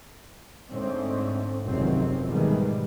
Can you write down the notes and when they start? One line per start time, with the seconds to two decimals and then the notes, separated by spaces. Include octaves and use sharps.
0.71 G#2 D3 A3 C4 C#4
1.65 F1 C#2 F#2 D#3 F#3 C4
2.26 G#2 B2 D#3 E3 G3 G#3